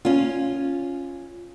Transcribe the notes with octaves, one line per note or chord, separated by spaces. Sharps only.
C#4 F4